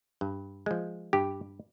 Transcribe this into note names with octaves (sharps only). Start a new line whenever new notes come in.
G2
F3 G#3
G2 G4